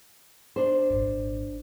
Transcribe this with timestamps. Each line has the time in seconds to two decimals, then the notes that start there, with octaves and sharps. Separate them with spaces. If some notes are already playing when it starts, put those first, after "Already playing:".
0.56 D4 C5
0.90 G#1 A#2